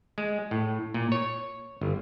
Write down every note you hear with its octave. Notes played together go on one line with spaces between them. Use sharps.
G#3
A2
A#2
C#5
G1